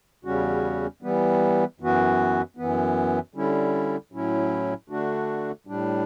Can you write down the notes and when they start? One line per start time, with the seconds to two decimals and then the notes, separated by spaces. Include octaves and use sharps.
0.24 E2 C#3 G3 C#4 F#4
1.02 E3 G3 B3
1.80 F#2 E3 B3 F#4
2.57 F#2 E3 B3
3.35 D3 G3 C#4 E4
4.12 A2 F#3 C#4 E4
4.90 D3 A3 D4 F#4
5.67 A2 G3 D4